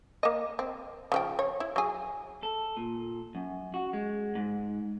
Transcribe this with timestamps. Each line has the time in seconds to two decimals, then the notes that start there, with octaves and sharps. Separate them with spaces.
0.23 A#3 D#5
0.59 C4
1.12 C#3 F3 G5
1.39 C#5
1.60 E4
1.76 F#3 G#4
2.43 A4
2.77 A#2
3.35 F#2
3.74 F#4
3.93 G#3
4.35 G#2